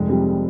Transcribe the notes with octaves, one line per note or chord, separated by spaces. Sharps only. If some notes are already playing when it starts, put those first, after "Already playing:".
Already playing: F1 G#3
F2 C3 G3